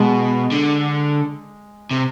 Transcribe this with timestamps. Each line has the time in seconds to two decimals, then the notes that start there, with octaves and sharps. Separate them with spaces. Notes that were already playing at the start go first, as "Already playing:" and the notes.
Already playing: B2 G#3
0.52 D3
1.91 C3